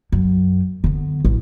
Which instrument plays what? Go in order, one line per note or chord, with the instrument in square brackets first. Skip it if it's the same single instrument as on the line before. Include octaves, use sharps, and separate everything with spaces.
[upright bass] F#2
D3 B3
A1